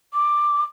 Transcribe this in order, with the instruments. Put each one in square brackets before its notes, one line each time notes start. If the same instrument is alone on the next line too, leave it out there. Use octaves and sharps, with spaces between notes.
[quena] D6